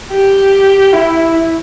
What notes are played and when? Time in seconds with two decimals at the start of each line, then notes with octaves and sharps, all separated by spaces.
0.12 G4
0.93 E4